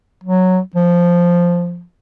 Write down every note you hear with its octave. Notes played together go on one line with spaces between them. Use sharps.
F#3
F3